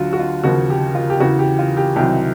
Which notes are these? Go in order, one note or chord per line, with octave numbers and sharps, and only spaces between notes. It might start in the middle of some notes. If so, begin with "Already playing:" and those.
Already playing: D2 D3 F#3 F4 F#4
F#4
F4
D#2 C#3 F3 F#4
G4
F4
G4
E2 C#3 E3 F#4
G4
F4
G4
C2 C3 D#3 F#3 G4